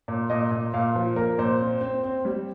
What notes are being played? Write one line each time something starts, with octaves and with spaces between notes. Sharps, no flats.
A#2
A#2 D#5
A#2
A#2 F5
F3
A#3 A#4
A#2 C5
C4
C4
C4
G3